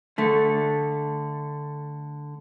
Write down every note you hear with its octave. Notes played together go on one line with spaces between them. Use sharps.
D3 A3